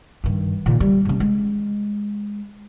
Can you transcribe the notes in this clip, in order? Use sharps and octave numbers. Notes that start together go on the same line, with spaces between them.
G2 D#3
A#2 D#3
G3
C3 C#4
G#3